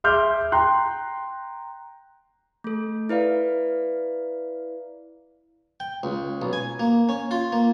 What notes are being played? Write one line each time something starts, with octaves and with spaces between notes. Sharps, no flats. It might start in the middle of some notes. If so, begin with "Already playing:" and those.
G#4 E5 C6 D6 F6 G6
G5 A#5 C6 F#6
A3 A4
E4 B4 D5 F5
G5
C#2
B1
G#5
A#3
C#4
F4
A#3